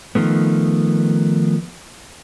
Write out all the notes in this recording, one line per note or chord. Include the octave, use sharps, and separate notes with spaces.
D#3 F3 A3 B3